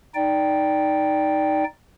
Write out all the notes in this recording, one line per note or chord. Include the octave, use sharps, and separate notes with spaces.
D#4 D5 G5